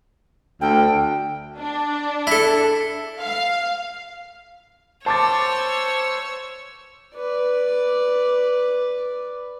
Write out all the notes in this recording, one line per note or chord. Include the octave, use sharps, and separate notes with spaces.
D2 G5
D4
E4 A4
F5
C5 C#5 A5 D6 E6 A6
B4 D5